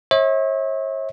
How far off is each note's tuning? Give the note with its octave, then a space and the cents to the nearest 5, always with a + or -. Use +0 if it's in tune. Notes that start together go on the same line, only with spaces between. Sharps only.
C#5 -40 E5 -40